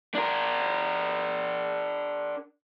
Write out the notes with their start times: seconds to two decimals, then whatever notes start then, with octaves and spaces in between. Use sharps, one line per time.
0.15 D4 A#4